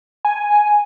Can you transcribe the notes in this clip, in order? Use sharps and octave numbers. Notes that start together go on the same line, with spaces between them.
G#5